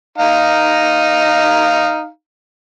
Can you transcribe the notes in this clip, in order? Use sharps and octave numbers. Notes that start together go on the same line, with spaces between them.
D#4 F5 A#5